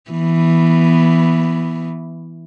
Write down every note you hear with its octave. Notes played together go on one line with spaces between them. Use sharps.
E3 B3